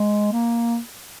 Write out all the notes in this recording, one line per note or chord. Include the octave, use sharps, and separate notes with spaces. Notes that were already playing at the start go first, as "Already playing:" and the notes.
Already playing: G#3
A#3